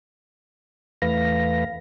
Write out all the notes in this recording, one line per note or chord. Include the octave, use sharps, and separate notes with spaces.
E2 E3 A3 B4 F5 A#6